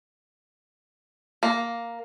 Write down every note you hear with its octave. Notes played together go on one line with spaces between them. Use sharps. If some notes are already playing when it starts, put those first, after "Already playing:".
A#3